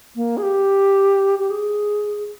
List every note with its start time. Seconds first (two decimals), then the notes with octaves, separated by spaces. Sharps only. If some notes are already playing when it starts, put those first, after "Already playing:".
0.16 A#3
0.37 G#4
0.43 G4
1.39 G4
1.50 G#4